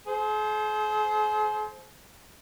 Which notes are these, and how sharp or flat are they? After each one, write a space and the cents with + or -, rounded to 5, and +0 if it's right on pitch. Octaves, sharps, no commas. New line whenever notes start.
G#4 +45 C5 +0